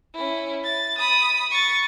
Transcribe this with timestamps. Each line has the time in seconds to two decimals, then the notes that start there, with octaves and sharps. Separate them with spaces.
0.14 C#4 E4
0.64 A6
0.98 B5 D#6
1.51 C#6 A6